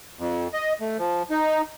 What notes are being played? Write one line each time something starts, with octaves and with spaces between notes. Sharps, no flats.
F2
D#5
A3
F3
D#4